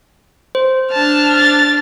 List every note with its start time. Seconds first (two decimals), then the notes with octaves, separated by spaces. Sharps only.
0.55 C5
0.92 D4 A5 F6
1.36 A6